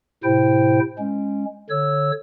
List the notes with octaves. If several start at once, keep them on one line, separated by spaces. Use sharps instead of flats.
A2 C3 E4 C5 G5
G#3 C#4
D3 C#5 E6